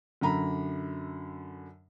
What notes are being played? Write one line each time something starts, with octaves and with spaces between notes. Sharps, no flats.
F#2 D3 A#5 B5